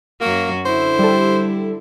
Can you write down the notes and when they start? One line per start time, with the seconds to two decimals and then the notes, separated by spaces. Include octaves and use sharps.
0.21 F#2 F#3 A#3 F#4
0.66 D3 E4 C5
0.99 G3 A4